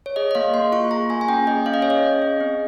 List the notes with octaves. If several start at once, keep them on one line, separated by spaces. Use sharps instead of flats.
C#5
G#4 D#5
D#5
A#3 F5
A#3 C6
F4 C#6
G#4 A#5
A#3 G#5
G#5
C#4 G5
G#4 D#5
C#4 F5
D#5
G#4 C#5
D#5
C#4
G#4
C4